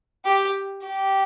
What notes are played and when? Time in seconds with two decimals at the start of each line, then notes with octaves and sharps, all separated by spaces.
0.25 G4
0.86 G4